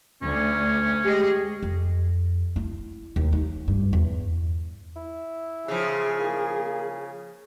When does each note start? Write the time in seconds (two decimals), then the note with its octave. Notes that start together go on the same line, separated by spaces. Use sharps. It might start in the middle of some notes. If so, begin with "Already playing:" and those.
0.22 D2 C#4
1.04 G#3 G4 G#4 D#5
1.63 F2
2.56 E4
3.16 D#2
3.33 D#4
3.68 G2
3.93 E2
4.96 E4
5.68 C#3 F3 G#4
6.19 A#3